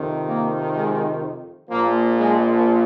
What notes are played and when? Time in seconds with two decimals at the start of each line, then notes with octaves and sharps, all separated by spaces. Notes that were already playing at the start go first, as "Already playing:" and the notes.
Already playing: F2 C3 D#3
0.28 A#3
0.75 G#3
1.69 A#1 A#2 F3 A#3
2.17 G#3